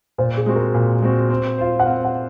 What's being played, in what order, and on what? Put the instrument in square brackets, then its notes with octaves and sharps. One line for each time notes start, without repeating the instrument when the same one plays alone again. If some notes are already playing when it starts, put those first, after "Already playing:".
[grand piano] A#2 [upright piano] C5
[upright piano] G#4
[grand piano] G#3 C4 F#4
[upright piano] A#4
[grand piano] A#2
G#3 C4 F#4
C4
F4 C5
[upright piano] F#5
[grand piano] C4 [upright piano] F5
[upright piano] F#5